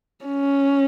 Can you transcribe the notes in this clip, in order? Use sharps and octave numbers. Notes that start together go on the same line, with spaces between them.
C#4